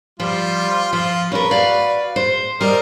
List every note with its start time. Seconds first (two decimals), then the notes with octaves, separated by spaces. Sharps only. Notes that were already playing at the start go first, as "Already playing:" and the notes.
0.20 F3 G3 F4
0.93 F3 F4
1.32 C#4 A#4 B4
1.51 F#4 D5 F5
2.16 C5
2.61 G3 A#4 C5 D#5